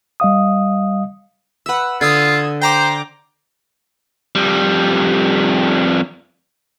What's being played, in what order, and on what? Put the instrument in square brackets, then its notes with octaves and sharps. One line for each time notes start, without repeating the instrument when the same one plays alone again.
[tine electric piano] G3 D#5 F5 D#6
[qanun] B4 E5 [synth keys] F#5 E6
[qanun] D3 [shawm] F4 [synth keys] D#6 E6 G#6
[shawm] C5 [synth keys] G5 A#5 D6
[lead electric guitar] F2 G3